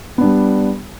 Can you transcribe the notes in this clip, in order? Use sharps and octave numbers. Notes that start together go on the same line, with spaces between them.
G3 B3 D4